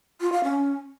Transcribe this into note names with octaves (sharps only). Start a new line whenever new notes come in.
F4
F5
C#4